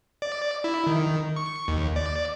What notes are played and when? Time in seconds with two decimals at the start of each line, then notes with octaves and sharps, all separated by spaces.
0.22 D5
0.64 E4
0.87 D#3
1.36 C#6
1.68 D#2
1.96 D5